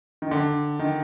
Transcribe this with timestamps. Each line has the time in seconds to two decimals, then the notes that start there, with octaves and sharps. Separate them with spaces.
0.22 D#3
0.31 D3
0.79 D#3